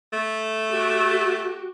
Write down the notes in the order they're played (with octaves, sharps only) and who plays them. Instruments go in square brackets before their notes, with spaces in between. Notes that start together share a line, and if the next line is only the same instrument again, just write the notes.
[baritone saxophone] A3
[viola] F#4 G4